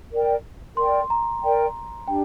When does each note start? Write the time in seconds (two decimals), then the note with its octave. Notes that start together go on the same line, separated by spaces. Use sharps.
0.12 A#4 D5 G5
0.77 A#4 D5 G5 C6
1.10 A#5
1.42 A#4 D5 G5
2.07 D4 G4 G5